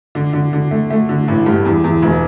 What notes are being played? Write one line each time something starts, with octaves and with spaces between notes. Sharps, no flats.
D3
D3
D3
A3
A3
D3
A1
G2
E2
E2
E1